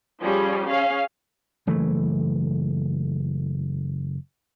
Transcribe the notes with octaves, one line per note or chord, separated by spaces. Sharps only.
F3 G3 C#4 G#4
C#4 G#4 F5
F#1 E3 A3